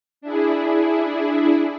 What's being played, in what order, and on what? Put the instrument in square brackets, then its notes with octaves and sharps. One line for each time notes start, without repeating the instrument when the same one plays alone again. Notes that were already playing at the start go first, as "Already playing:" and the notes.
[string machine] D4 E4 G#4